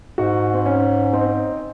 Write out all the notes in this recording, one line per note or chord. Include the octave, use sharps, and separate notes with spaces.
G#2 D#4 F#4
C4
C#4
C4 D#4